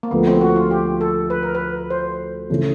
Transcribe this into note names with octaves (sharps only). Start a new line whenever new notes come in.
A#3
D2 D3 F3 A3 B3
C4
F#4
F4
G4
A4
B4
A#4
B4
C5
C#3 E3 A3 C#4